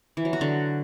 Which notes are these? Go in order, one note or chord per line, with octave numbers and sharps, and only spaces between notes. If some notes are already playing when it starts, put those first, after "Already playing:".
E3
F#3
F#4
D3